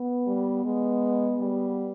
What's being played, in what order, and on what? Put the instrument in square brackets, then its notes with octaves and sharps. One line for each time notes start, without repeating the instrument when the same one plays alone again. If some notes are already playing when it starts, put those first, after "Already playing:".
Already playing: [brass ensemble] B3
[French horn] G3
G#3
G3